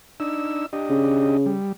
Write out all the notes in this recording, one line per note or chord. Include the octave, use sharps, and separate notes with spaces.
D4 D#4 E6
D4 G4 D#5
C#3
G3